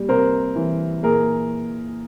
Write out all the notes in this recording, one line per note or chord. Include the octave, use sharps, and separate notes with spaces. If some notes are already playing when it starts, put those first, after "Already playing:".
Already playing: A#2 G3
C3 A#4 C5
E3
A#2 G#4 A#4